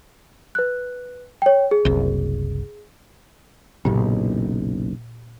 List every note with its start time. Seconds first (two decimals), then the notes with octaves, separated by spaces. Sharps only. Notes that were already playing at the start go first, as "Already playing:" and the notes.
0.55 B4 F#6
1.42 C#5 G5
1.71 G#4
1.85 F#1 C2
3.85 F#1 B1 A#2